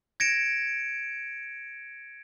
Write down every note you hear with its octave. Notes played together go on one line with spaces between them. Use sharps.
G#6 A#6 C#7 D7 E7